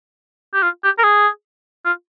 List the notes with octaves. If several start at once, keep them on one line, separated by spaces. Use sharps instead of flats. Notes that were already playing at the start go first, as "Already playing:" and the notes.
G4
F4
G4
A#4
G#4
F4